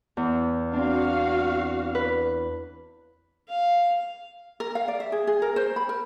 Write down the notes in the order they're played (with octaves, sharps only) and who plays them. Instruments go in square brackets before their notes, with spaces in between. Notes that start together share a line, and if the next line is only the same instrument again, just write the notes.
[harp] E2
[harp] C4 D4 [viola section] F#4 F5
[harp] B4
[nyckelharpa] F5
[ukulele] A#4
F5
D5
E5
G#4
G#4
A#4
C5
B5
A#4